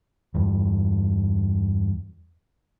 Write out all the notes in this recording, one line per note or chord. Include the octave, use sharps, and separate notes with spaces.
E2 G2